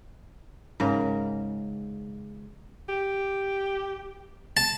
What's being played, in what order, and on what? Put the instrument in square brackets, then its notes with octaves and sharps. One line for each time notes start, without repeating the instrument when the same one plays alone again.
[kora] G#2 C#3 A#4
[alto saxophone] G4
[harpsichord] A5